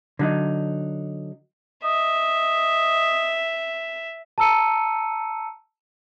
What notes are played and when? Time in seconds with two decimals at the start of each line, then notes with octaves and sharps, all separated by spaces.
0.19 D3 F#3 D#4
1.84 D#5 E5
4.38 A5 A#5 E6 C#7 D#7